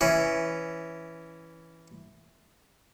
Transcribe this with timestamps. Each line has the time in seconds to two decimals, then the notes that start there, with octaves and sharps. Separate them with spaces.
0.01 E3 C#4